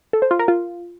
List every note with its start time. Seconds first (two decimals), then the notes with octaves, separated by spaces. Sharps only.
0.13 A4
0.22 C5
0.31 F4
0.39 A#4
0.48 F4